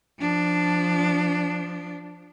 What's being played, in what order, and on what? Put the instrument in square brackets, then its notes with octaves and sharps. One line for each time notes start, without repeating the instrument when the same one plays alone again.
[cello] F3 D4